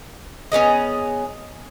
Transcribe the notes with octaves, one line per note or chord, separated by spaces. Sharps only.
B3 C#4 G#4 D#5